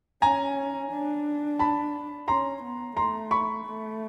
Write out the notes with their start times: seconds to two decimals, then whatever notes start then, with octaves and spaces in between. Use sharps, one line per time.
0.22 C#4 G#5 A#5
0.91 D4
1.59 A5 B5
2.28 C#4 A#5 C6
2.62 B3
2.96 A3 A#5 C6
3.31 B5 C#6
3.65 A3